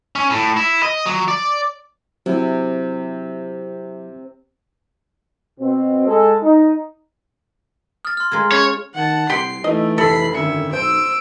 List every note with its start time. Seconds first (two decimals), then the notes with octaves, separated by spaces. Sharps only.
0.16 C#4
0.30 A2
0.56 E4
0.83 D#5
1.06 F#3
1.28 D5
2.26 C3 F#3 C4 E4
5.59 B2 C4
6.07 G#3 A4
6.42 D#4
8.05 D#6 F6 A6
8.17 C6 F6
8.32 G#3 F4 A#4 A#5 G#6
8.52 C#4 G#4 C#5 G#6
8.95 D#3 F#5 A5
9.30 C2 G4 C6 C7 D7
9.64 E3 A3 D#4 E4 D#5
9.98 F1 A4 B5 C7
10.34 G#1 F#2 D3 E5 C#7
10.73 B1 C5 E6 G6 D7